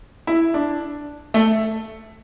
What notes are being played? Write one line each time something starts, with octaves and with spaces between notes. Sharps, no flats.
E4
D4
A3